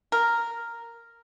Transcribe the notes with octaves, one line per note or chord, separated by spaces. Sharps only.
A#4